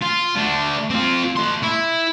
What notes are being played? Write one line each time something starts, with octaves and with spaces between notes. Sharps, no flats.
F4
A3 D4
C4 F4
A3 C6
E4